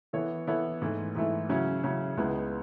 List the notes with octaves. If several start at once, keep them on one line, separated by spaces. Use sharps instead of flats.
E3 B3 E4 A4 C#5
E3 B3 E4 A4 C#5
G#2 E3 A3 E4
G#2 E3 A3 E4
C#3 F#3 C#4 E4
C#3 F#3 C#4 E4
C#2 C#3 G#3 B3 E4